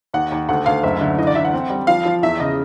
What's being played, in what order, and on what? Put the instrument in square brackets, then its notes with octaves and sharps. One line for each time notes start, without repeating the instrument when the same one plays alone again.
[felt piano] D#2 [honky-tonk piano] F#5
[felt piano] D#2
[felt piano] D2 [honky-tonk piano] F#5
[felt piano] D2 [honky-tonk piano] F5
[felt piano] F#1 [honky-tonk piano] E5
[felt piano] D3
[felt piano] E3 [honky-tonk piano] D#5
[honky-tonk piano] D5
[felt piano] E3 [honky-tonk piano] E5
[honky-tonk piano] F#5
[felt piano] C4
G3
[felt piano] F3 [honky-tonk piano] F5
[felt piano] F3
[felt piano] E2 [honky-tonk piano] E5
[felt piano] C#3 [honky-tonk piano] D#5